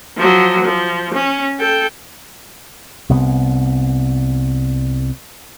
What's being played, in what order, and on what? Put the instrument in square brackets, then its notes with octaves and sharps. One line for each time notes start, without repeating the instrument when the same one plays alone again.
[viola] F3 F#3
F3
C#4
A4 G5
[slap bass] C2 C3 B3